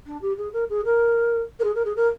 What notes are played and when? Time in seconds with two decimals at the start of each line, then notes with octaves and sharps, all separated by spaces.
0.06 D4
0.21 G4
0.37 G#4
0.53 A#4
0.69 G#4
0.85 A#4
1.59 A#4
1.64 G#4
1.75 A#4
1.85 G#4
1.96 A#4